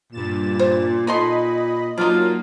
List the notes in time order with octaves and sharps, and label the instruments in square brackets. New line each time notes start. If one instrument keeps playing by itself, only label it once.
[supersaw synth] G2 A6 E7 [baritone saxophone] A#2
[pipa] C5
[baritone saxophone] A#2 [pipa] D#4 A4 C6 [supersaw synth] D#5 B5
[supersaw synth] F#3 A#3 [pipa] D4 D#4 [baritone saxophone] F4